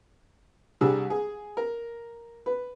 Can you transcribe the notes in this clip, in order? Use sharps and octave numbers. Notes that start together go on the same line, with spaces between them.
C2 G3 D4 G#4 E6
G#4
A#4
B4